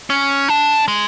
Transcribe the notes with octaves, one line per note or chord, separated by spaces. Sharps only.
C#4
D4
G#3